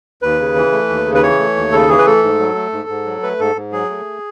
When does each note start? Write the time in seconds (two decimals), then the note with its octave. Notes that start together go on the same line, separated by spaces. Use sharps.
0.22 D#2 B4
0.39 C#3
0.56 E3
0.72 A3
0.89 D#2
1.06 C#3
1.15 B4
1.23 E3 C#5
1.39 A3
1.56 D#2
1.72 C#3 A4
1.89 E3 G#4
1.98 B4
2.06 A3 A4
2.23 G#2
2.39 F#3
2.55 A3
2.73 G#2
2.89 G#2
3.05 F#3
3.23 A3 B4
3.40 G#2 A4
3.55 G#2
3.72 F#3 G#4
3.90 A3